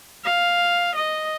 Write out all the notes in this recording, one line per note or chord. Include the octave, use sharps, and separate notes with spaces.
F5
D#5